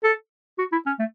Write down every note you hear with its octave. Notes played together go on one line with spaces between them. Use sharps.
A4
F#4
E4
C#4
A3